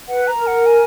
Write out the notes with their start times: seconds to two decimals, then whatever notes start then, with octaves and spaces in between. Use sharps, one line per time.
0.08 B4 F#5
0.28 A#5
0.37 A#4
0.47 F#5
0.66 G#5